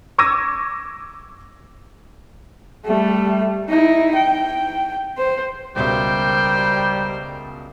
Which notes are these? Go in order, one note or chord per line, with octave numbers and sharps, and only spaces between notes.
C#6 D6 E6 G#6 A#6 D#7
G3 A3
D#4 E4
G5
C5
C#2 B2 G3 A#4 C5 E5 G5